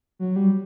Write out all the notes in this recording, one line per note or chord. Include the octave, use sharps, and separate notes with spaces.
F#3
G3